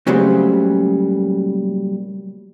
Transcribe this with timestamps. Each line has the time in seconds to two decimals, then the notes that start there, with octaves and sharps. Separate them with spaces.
0.07 A#2 C#3 F#3 G3 A3 C4